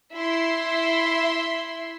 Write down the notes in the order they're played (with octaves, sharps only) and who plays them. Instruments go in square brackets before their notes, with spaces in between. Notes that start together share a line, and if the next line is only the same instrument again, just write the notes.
[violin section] E4 E5 C6